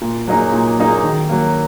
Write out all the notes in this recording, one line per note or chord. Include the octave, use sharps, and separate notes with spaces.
A#2
F#3 A#3 D#4 G#4
A#2
F#3 A#3 D#4 G#4
D#3
F#3 A#3